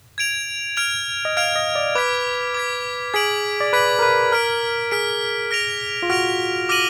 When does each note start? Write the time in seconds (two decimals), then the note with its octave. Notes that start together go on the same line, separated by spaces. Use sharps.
0.18 G#6 D7 F7
0.77 F6 G#6 D7 F7
1.25 D#5
1.37 F5 F6 G#6 D7 F7
1.56 D#5
1.75 D5
1.95 B4 D6 G#6 B6
2.54 D6 G#6 B6
3.14 G#4 G#6 B6 D7 F#7
3.61 D5
3.73 B4 G#6 B6 D7 F#7
3.99 A#4
4.02 B4
4.32 A#4 F6 B6 D7
4.91 G#4 F6 B6 D7
5.51 F6 A#6 D7 F7
6.03 F4
6.10 F#4 F6 A#6 D7 F7
6.69 D6 F6 A#6 D#7 F#7